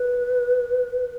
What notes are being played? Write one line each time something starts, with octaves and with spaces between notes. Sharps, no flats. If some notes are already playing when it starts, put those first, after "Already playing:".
Already playing: B4